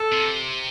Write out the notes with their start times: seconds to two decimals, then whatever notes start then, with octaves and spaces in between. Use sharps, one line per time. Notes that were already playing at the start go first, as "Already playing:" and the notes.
Already playing: A4
0.12 C3